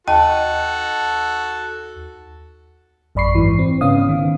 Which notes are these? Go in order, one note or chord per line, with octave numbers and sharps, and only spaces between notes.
D#2 F#4 A4 D#5 A5
A1 F#2 D5 B5 C#6 C7
G#2 E3
C4
G#2 C#3 B3 C#4 F5 D#6
D#3